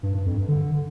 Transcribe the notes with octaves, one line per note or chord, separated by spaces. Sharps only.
G2
G2
F2
G2
D3